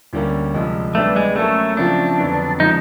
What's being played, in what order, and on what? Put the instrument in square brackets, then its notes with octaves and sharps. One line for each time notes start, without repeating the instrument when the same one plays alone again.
[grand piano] D2 D3 G3 A#3 C#4
C2 C3 F3 G#3
[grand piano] E3 G3 B3 D4 [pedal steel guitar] A3
[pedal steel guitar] G#3
[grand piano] F#3 A#3 C#4 E4 A4 [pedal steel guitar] A3
[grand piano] C#3 F3 A3 C4 F4 [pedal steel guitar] D4
[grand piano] F2 D3 F#3 B3
[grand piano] C#3 F3 G#3 [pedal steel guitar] D#4